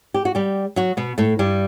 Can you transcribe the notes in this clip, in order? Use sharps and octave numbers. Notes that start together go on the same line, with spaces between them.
G4
F#4
G3 G4
F#3 F#4
B2 B3
A2 A3
G2 G3